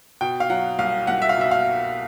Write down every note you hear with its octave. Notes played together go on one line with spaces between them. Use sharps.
B2 G5
F5
F#3 F#5
C2 F5
C2 F#5
E5
F5
B2 E5
F5